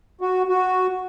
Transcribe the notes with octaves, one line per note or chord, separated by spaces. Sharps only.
F#4
F#4